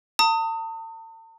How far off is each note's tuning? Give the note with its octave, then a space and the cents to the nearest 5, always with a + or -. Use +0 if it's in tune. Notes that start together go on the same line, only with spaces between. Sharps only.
A5 +45 D#6 +15